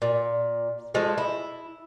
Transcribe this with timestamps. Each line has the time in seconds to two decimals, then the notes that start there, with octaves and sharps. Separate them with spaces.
0.02 A#2
0.94 F3 G#3 A3
1.18 E4